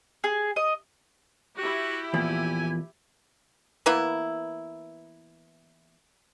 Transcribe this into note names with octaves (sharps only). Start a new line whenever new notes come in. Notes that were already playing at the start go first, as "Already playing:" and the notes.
G#4
D#5
E4 F#4 G4
E2 A#2 F3 G#5
E3 A#3 B3 E4